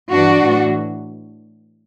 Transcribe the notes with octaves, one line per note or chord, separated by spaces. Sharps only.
G2 E3 D4 F#4
A2 E3